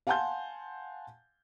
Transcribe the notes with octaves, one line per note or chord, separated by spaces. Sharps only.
F5 F#5 G#5 A5 C6 G6